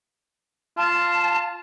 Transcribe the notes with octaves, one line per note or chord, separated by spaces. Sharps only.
F4 A5